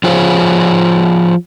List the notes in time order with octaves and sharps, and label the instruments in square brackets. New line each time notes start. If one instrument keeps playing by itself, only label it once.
[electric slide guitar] F3 F4 G#4 C5 C#5